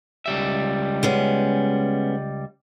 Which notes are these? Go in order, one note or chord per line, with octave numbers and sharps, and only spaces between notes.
C#2 G3 E5
G#3 B3 C#4